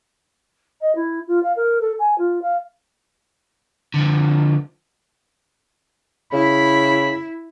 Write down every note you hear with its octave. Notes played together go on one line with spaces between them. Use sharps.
D#5
E4
F4
F5
A#4
A4
G#5
F4
F5
D3 F3
C#3 E4 B5